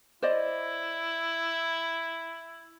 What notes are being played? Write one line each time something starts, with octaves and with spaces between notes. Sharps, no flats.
E4 C5 D5 D#5